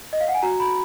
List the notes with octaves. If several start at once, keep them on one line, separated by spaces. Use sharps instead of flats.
D#5
F5
F#5
G#5
F#4 A#5
B5